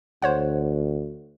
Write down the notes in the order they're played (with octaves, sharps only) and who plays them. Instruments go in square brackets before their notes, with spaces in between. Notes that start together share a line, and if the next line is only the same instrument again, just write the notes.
[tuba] D2 [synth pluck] C5 C#5 F#5